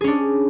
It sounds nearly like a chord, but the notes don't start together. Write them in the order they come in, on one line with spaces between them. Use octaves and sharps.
G#4 C#4 D4